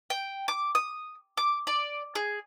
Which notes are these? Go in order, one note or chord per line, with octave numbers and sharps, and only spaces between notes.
G5
D6
D#6
D6
D5
G#4